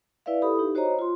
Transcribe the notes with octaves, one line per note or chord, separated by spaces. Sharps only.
E4 B4 D5 E5 F5
E4 G4 A4 B5 D#6
D#4 G4
F#4 C5 C#5 D#5 A#5
F4 C6